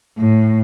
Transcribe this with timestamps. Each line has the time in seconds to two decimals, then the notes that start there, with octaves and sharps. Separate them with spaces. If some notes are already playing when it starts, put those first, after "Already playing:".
0.18 A2